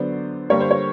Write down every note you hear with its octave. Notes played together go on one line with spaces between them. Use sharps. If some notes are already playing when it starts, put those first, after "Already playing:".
Already playing: D3 F#3 B3 C5 D5
D3 G3 A#3 C#5
C5
C#5